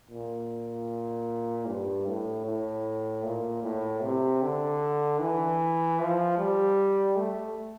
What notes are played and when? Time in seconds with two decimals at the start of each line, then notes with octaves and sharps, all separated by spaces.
0.11 A#2
1.68 G2
2.07 A2
2.45 A2
3.25 A#2
3.63 A2
4.02 C3
4.42 D3
5.21 E3
5.99 F3
6.38 G3
7.16 A3